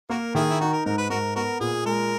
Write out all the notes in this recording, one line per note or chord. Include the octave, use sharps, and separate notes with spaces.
A#3 F#4 A#4
D#3 E4 G#4
E4
D#4 F#4
A#4
G#2 A#4
B4
G#2 F#4 A#4
B3 F#4 A#4
A#2 G#4
G#3 A#4